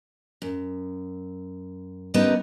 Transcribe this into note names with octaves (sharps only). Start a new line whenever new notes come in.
F#2
F#2 D3 G3 B3 D#4